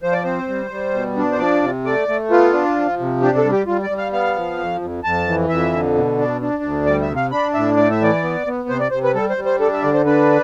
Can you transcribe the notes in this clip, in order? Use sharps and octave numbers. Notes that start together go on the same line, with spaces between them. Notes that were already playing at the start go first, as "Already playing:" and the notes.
F3 C5
D5
C4 C5
G3
G3
B2
D4
C5
F3 D5
C3
A3 D5
A3
B3 F4
D4
F3
C3
D4 G4
A4
G3
G4
G3 F4
D5
G3
F5
B3 F5
F3
F2
F2
F2 A5
E3
F2 E5
D3
B2
D4
D4
D2
G3 D5
E5
C3
F5
D4 B5
A2 E5
A3 D5
E5
E3 D5
B3
B3
C3 C5
D5
C3 C5
B4
G3 A4
C5
G3
C5
D4 A4
E5
D3 D5
C5
D4 B4